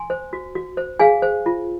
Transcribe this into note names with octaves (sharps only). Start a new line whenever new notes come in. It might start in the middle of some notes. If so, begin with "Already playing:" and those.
Already playing: G#5 C6
C5
F#4
F#4
C5
G#4 F5 G#5
C5
F4